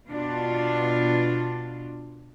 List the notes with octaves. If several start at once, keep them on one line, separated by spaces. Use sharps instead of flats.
B2 D4 F4